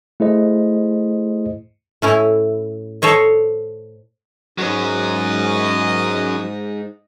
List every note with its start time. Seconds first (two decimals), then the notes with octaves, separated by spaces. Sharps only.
0.20 A3 E4 G#4 C5 D#5
2.02 A2 C#4 E4
3.02 A4 C5 C#5 D#5
4.58 G#2 F#3 C#4 D#5